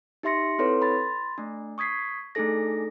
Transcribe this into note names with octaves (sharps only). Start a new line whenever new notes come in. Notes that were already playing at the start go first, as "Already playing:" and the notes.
D#4 G4 E5 C6 A#6 C#7
C4 E4 A4 B4 C#5 C6
B5 C6 A6
A3 D4
C#6 D#6 G#6 B6 C7
A3 D4 D#4 G#4 A4 A#6